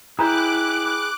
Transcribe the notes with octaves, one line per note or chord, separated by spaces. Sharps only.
E4 G#4 B4 G5 A#5 B5 D6 F#6